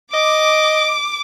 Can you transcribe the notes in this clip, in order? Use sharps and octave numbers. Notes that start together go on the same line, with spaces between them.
D#5 D6